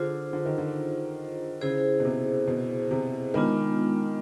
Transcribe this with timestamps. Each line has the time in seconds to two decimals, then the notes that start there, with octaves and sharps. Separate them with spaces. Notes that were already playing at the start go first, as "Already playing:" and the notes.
Already playing: D3 D4 F4 G#4 C5
0.33 D3
0.45 D#3
0.58 D3
1.61 C#3 E4 G#4 C5
2.00 B2
2.05 C3
2.47 B2
2.91 C3
3.34 D#3 G#3 B3 D4 F4